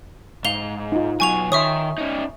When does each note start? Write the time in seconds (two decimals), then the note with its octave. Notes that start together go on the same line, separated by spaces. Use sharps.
0.45 G#2 F5 F7 G7
0.92 D#4 F4
1.20 B1 F#3 G#5 C#6 F7
1.52 D#3 C#5 E5 C6 C#6 D#6
1.98 C#4 D#4